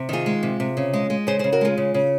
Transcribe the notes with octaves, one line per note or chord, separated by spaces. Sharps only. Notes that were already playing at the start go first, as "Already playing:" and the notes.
Already playing: C3
D#3 F4 G#4
G#3
C3
C3
C#3
G#3
G#3
C#3 G#4 C5
C#3 G#4 C5
F#4 A#4
G#3 F4 G#4
C#3
C#3